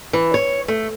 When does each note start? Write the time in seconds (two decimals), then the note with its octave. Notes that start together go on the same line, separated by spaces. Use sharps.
0.13 E3
0.34 C#5
0.68 A3